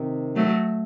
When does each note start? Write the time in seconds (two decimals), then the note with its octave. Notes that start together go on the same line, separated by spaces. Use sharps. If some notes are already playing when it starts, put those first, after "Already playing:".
Already playing: C3 D#3
0.36 F#3 A3